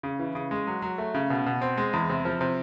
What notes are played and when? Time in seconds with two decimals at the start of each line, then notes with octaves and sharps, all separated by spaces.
0.03 C#3
0.19 E3
0.35 C#3
0.51 G#3
0.67 F#3
0.82 F#3
0.98 A3
1.14 C#3
1.30 B2
1.46 B2
1.62 C4
1.77 G#3
1.93 E2
2.09 C3
2.25 F3
2.41 C3